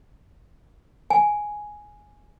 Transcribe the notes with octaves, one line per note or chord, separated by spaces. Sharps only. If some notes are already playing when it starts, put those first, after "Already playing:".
G#5